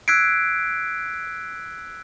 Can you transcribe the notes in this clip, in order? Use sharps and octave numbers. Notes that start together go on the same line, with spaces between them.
E6 F#6 G#6 B6 C7 D7